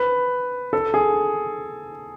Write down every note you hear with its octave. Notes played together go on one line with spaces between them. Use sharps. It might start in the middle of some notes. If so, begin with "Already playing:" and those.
Already playing: B4
A4
G#4